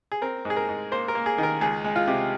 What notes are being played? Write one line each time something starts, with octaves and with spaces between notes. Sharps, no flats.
G#4
C4 A#4
G#2
G#4
A#4
G#2
A#3 C5
A#4
A#3
G#4
D#3 A#4
C#2 G#4
G#3
F4
C3